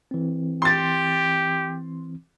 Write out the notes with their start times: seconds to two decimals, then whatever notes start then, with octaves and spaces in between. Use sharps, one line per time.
0.11 E3 C4
0.62 G4 C6 A6